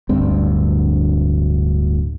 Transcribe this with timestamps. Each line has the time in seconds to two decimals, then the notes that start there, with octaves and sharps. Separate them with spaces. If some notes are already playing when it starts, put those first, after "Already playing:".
0.09 D1 D2 G2 C4